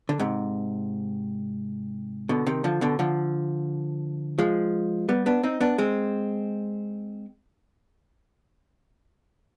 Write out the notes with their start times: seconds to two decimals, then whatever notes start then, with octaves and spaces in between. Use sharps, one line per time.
0.09 D3
0.19 G#2 C3
2.29 B2 D3
2.47 C3 D#3
2.64 D3 F3
2.81 B2 D3
2.99 D3 F3
4.39 F3 G#3
5.09 G3 B3
5.26 B3 D4
5.43 C4 D#4
5.61 B3 D4
5.78 G#3 C4